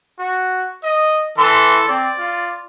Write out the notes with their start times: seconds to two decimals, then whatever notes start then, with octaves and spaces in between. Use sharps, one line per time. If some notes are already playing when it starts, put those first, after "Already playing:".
0.19 F#4
0.84 D#5
1.38 E3 A4 C6
1.89 C4 D5
2.19 F4